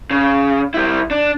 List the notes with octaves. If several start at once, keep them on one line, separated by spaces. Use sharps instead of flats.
C#3
G3 E4
D4